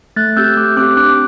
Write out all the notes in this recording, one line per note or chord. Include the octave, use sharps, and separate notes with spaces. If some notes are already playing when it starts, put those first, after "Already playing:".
A3 F#6 A6
C4 G4 E6 G6
A3 D6 F#6
C4 G4 D6 F#6
D4 D6 F#6